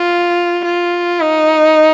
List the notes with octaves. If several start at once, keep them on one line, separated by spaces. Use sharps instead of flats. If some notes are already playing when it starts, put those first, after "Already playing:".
Already playing: F4
F4
D#4